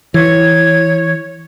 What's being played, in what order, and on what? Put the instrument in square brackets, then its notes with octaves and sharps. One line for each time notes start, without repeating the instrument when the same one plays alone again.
[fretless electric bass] E3 [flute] C#5 [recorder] G#6